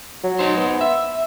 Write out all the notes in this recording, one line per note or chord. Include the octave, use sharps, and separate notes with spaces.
F#3
D#4 C5
B3
E5